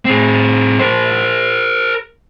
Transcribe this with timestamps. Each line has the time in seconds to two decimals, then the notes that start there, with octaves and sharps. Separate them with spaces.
0.05 C4 G#4
0.79 A#4 C5